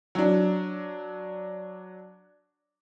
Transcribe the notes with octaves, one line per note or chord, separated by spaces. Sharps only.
F#3 D4